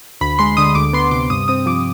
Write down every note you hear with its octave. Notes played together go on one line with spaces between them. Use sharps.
D2 B5
G#3 C6
D3 D#6
D2 D6
B3 C6
C3 D6
G2 D#6
C4 D#6
F3 D6